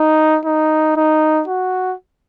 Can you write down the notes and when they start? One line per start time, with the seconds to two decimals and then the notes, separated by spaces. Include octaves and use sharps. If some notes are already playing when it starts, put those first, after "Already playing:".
Already playing: D#4
0.45 D#4
0.96 D#4
1.48 F#4